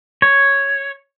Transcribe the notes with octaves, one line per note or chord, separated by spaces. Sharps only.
C#5